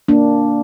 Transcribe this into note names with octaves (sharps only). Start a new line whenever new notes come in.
A#3 D4